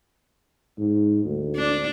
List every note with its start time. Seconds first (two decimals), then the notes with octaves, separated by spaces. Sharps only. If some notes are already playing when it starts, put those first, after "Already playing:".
0.78 G#2
1.25 D2
1.56 D4